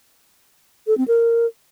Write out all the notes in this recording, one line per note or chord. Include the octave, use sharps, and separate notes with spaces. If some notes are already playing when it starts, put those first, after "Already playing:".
A4
C4
A#4